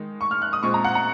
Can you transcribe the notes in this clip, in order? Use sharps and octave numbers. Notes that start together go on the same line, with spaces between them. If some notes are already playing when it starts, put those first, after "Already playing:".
Already playing: D#3 G#3 D#4
C#6
F6
F#6
D#6
A#2 G#3 C4 C#6
A#5
F#5
A#5